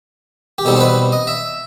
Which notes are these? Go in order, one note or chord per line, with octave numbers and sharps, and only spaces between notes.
G4
B2 G3 C4 D#4 A4
C5
B4
D#5
E5